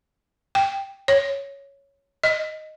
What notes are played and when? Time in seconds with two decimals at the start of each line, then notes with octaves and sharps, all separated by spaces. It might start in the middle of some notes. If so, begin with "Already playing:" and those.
0.55 G5
1.08 C#5
2.23 D#5